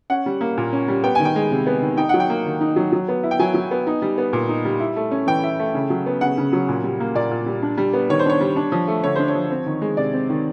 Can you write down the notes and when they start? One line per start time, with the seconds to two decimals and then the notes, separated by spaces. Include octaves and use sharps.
0.10 C#4 F#5
0.26 G3
0.41 A#3
0.57 A#2
0.73 C#4
0.88 G3
1.04 B3 G5
1.15 D#3 G#5
1.25 G5
1.36 G#3
1.52 C3
1.66 B3
1.82 D#3
1.97 D#4 G5
2.09 F#3 F#5
2.20 G5
2.30 A#3
2.46 D#3
2.61 D#4
2.76 F#3
2.92 F#3
3.08 B3
3.23 E4
3.31 G5
3.39 F#3 G#5
3.54 F#3
3.71 B3
3.87 D#4
4.02 G3
4.18 B3
4.33 A#2
4.49 D#4
4.65 G3
4.80 E4
4.96 A3
5.11 C#4
5.27 E3 G5
5.43 E4
5.59 A3
5.74 C#3
5.90 F#3
6.06 B3
6.21 C#3 F#5
6.38 C#3
6.53 F#3
6.68 A#2
6.84 G3
7.00 A#3
7.15 A#2 D5
7.31 A#2
7.46 G3
7.62 D4
7.78 G3
7.93 B3
8.09 D#3 C#5
8.19 C5
8.25 D4 C#5
8.41 G3
8.56 D4
8.72 F3
8.88 A3
9.04 D3 C#5
9.15 D4 C5
9.28 C#5
9.35 F3
9.51 C4
9.66 D#3
9.82 G#3
9.97 C3 D5
10.14 C4
10.30 D#3